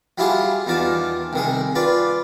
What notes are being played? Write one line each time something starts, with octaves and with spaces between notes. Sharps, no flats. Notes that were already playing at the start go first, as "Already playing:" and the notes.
F#3 G3 E4 F4 G4 G#4
E2 D#3 F4 D5 A5
C2 D#3 G#4
F4 B4 D5